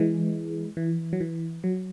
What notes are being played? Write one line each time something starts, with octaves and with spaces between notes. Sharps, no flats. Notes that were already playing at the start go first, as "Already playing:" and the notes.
Already playing: E3 G#3
E3
F#3
E3
F#3